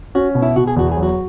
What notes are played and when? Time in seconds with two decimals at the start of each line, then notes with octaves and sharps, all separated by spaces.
0.15 C#4 F#4
0.35 B2
0.42 E4
0.56 B2 F#4
0.67 G#4
0.76 E2 F#4
0.91 F#3 G#4
1.03 F#4